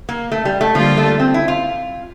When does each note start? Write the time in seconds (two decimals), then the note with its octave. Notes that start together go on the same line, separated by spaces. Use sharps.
0.09 A#3
0.32 A3
0.45 G3
0.61 A3
0.75 D3 F3 G3 A#3 F4 A4
0.97 A3
1.20 C4
1.34 E4
1.48 F4